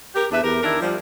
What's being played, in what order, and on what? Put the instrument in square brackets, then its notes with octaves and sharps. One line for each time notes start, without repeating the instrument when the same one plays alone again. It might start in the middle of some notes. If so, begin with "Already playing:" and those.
[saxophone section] G4 A#4
E2 D4 B4 E5
E2 G4 A#4
D#3 D4 E4 A#4
F3 G3